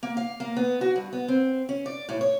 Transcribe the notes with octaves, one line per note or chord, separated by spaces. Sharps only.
A#3
F5
A#3
B3
F#4
G2
B3
C4
C#4
D5
A2
C#5